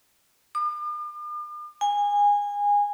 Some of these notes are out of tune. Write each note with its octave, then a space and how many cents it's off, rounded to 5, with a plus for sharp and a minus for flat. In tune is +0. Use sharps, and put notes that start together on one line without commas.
D6 +45
G#5 -20